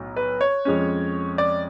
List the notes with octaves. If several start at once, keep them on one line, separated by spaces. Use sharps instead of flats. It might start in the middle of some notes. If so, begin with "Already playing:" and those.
Already playing: B1 A2 F#3
B4
C#5
F2 F3 G#3 C#4
D5